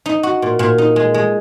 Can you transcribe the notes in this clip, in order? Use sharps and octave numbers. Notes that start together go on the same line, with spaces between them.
D#4
F#4
A#2
A#2
D#4
G#3
G#3